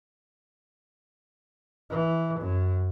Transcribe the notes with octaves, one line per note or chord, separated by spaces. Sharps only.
E3
F#2